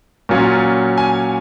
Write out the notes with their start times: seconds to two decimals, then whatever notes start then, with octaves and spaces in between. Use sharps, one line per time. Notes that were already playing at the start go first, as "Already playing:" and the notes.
0.29 A#2 F#3 C#4 F4
0.98 G#5